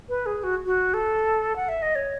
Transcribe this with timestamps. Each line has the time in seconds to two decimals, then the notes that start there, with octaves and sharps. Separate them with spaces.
0.09 B4
0.26 G#4
0.44 F#4
0.66 F#4
0.94 A4
1.56 F#5
1.69 E5
1.82 D#5
1.95 C#5